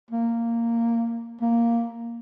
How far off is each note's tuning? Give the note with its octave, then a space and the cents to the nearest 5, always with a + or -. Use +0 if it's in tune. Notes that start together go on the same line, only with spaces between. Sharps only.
A#3 -10
A#3 +0